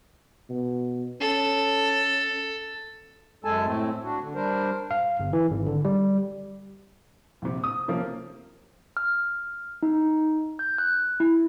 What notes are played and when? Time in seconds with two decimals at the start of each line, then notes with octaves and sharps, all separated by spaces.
0.50 B2
1.21 C#4 A4
3.45 F#2 G#3 A4 G#5 A5
3.66 A2 A3 C4
4.04 D4 F#4
4.20 D3
4.35 G3 D4 A#4 C5
4.91 F5
5.20 G1
5.33 E3
5.51 G#1
5.67 D3
5.85 G3
7.42 A#1 C3
7.64 D#6
7.88 C3 F3 A#3 C#4
8.97 F6
9.83 D#4
10.59 G6
10.78 F#6
11.20 E4